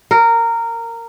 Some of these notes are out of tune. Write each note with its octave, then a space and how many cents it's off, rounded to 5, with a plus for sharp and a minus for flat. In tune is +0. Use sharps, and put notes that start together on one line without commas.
A#4 -15